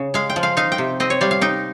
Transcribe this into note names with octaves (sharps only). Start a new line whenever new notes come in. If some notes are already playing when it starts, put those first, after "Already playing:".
Already playing: C#3
G#3 F5
G5
F3
F5
D#4 F5
G5
C3
C4 D#5
C#5
G3 F5
F5
D#4 G5